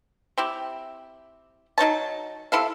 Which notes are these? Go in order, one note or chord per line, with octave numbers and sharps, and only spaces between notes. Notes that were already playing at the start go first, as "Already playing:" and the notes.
C4 E4 G4
F#3 D#4 C#5 A5
C3 E4 A4 F5